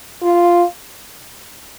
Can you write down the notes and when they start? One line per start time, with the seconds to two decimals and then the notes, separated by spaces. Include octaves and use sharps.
0.23 F4